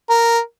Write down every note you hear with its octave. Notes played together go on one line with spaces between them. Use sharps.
A#4